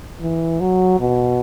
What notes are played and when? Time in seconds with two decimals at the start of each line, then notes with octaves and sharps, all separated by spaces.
0.21 E3
0.60 F#3
1.00 B2